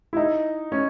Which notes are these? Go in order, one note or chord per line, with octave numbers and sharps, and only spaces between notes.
E4
D#4
C#4